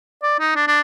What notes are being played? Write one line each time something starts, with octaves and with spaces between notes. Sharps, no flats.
D5
D#4
D4
D4